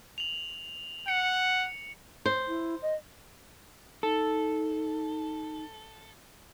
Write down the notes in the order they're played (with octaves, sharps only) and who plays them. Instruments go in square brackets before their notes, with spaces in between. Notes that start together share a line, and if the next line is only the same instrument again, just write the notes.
[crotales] F7 F#7
[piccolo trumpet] F#5 [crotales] C#7
[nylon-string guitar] C5
[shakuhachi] E4
D#5
[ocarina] D#4 [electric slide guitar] A4